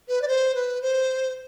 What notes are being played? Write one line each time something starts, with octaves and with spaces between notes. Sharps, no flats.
B4
D5
C5
B4
C5